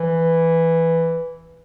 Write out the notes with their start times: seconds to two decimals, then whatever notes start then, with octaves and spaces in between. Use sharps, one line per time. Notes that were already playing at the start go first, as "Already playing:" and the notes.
Already playing: E3